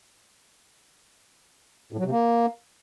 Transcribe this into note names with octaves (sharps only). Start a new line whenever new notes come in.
A2
F#3
C3
A#3